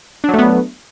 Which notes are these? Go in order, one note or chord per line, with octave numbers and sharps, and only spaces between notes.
F#3 A3 B3 D4